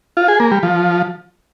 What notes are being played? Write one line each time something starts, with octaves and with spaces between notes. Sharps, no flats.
F4
G#4
A#3
G3
F3